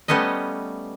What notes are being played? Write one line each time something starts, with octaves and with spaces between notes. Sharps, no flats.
G3 A3 B3 C#4 D#5